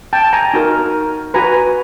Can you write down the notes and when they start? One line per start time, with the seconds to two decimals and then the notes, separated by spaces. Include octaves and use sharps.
0.13 G5 A5
0.33 G#5 A#5
0.54 D#4 F#4 A#4
1.34 F#4 B4 G#5 A#5